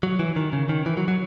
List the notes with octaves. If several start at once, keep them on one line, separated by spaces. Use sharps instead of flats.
F#3
E3
D#3
C#3
D#3
E3
F#3
F#3